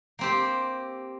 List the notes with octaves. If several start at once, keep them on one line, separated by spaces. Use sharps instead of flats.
A#3 C4 G4